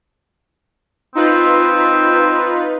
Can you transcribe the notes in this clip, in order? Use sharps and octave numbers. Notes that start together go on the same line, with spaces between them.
C4 D#4 F4 B4